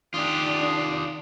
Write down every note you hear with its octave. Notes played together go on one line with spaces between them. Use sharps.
D#3 D4 F4 G4 D#6